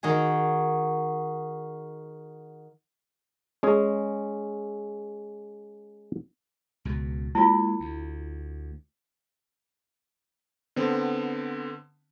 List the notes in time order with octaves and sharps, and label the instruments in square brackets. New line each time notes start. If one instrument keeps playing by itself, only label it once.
[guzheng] D#3 D#4 F#4 G#4
[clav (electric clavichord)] G#3 C#4 G#4
[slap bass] C#2 B2
[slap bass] G#3 A#3 [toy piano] E4 F4
[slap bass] D2
[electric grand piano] D3 B3 C4